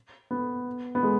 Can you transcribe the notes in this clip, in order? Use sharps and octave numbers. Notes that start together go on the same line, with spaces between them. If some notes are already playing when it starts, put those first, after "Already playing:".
B3
B3
G#3